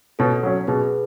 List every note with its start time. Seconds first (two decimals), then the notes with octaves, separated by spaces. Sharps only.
0.19 B2 A4 C#5
0.43 F#3 C#4
0.67 B2 G#4 B4